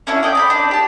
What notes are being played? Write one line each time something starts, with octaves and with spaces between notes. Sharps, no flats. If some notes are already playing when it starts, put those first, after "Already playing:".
C#4 D4 E4 F#4
D5 D#5 F#5 G5
D5 A#5 B5
D4 D#4 D5
G4 A5